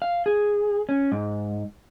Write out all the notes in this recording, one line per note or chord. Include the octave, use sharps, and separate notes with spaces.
F5
G#4
C#4
G#2